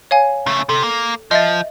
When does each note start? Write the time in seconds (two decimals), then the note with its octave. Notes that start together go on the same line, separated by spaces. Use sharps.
0.11 C#5 F5 G#5
0.46 C#3 A3
0.69 C3 A4
0.83 A#3
1.31 F3 D#5 E5 A6